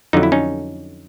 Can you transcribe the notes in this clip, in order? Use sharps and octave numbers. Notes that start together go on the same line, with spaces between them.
F2 D3 F#3 D#4
E4
C#4 D#4